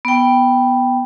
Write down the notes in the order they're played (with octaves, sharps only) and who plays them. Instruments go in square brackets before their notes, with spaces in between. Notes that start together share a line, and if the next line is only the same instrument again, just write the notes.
[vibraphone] B3 G5